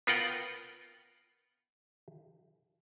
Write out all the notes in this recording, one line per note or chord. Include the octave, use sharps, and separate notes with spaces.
B3 F4 A#4 F#5 G5